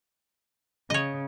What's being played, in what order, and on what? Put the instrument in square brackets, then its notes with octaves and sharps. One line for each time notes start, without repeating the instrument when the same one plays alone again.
[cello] C#3 [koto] C#5 D#5